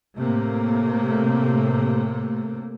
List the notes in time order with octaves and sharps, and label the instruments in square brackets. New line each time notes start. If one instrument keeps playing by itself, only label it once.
[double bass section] A2 C3 A3 A#3